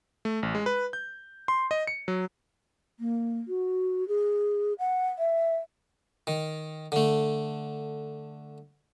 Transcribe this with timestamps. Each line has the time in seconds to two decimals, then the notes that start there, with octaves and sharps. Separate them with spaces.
0.25 A3
0.43 A1
0.55 G#3
0.66 B4
0.93 G6
1.48 C6
1.71 D#5
1.87 C#7
2.08 F#3
3.00 A#3
3.48 F#4
4.08 G#4
4.79 F#5
5.19 E5
6.27 D#3
6.92 D3 A3